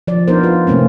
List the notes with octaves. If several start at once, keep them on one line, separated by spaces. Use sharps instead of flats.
F3 D5
B3 D4 D#4 A#4 C5
F4 B4
C3 A3 A#3 C4 C#4